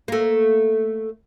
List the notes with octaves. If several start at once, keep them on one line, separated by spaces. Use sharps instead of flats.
A3 A#3